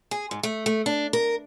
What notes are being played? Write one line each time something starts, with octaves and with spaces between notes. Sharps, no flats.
G#4
G#2
A3
A3
D4
A#4